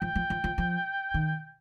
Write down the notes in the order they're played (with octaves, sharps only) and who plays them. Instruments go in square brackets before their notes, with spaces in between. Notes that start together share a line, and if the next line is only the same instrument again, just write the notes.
[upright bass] F3 [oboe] G5
[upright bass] F3
F3
F3
F3
D#3